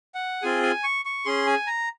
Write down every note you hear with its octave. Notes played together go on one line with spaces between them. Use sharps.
F#5
C4 F4 G#4 G#5
G#5
C#6
C#6
C#4 G#4 C6
G#5
A#5